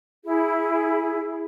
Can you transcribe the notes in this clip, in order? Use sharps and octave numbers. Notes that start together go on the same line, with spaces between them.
E4 G#4